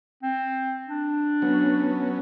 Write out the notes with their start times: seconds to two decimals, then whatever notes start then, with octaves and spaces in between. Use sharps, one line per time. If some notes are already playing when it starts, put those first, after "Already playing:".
0.23 C4
0.88 D4
1.42 F#3 B3 C#4